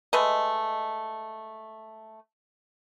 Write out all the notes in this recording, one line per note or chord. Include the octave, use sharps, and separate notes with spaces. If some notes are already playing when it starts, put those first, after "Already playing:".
G#3 A3 B4 D#5